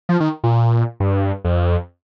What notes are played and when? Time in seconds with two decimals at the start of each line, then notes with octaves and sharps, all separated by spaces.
0.09 F3
0.20 D#3
0.44 A#2
1.00 G2
1.44 F2